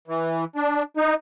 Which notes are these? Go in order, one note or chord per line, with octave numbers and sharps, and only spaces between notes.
E3
D4
D#4